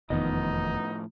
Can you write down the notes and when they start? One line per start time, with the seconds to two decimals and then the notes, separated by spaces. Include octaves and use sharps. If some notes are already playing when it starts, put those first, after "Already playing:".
0.10 F1 E2 A2 D#3 F3 B3 D#4 D#5